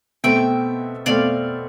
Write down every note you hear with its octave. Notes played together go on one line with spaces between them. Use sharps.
B2 A3 C4 E5 G5
B2 A3 C4 D5 F5